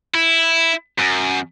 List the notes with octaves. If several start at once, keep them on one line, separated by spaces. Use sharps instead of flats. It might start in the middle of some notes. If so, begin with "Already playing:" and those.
E4
F#2